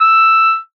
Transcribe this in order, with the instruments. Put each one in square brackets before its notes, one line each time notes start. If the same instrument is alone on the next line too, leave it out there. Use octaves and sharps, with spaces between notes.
[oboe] E6